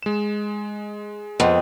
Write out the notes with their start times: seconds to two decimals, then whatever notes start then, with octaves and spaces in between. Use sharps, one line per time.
0.03 G#3 E7
1.40 F2 B3 C4 D#5